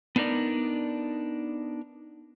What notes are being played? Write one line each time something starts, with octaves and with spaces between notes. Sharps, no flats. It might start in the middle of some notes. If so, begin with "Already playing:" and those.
B3 D4 D#4 A#4 D5